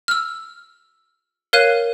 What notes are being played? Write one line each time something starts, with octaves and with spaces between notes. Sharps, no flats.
E6 F6
A#4 C#5 F5 F#6 D#7